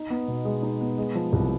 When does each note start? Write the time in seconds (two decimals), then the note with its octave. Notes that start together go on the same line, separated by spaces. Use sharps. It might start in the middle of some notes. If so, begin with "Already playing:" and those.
Already playing: D#4
0.10 B3
0.28 B2
0.45 G#3
0.63 D#4
0.81 B3
0.98 G#3
1.15 F3
1.33 C2